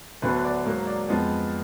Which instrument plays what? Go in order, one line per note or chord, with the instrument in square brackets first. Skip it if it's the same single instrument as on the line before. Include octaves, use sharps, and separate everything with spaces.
[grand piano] D2 D3 F#3 B3 B4
D5
G#2 F#3 A#3
D5
F2 F3 G#3 B3 D#5